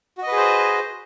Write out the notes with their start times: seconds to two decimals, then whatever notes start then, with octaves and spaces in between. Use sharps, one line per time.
0.18 F#4
0.22 D#5
0.27 B4
0.32 G#4
0.37 C5